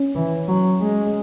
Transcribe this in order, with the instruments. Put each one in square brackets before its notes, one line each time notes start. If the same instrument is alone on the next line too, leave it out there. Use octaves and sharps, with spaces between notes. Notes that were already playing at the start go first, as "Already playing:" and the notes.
Already playing: [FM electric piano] C#4
[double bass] E3
F#3
G#3